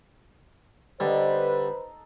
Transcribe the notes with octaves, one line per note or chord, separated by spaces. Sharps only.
D3 G3 D#4 A4 B4 C5 D#5